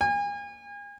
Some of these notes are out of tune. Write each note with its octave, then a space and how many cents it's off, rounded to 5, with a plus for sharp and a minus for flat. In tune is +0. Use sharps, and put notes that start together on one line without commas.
G#5 -35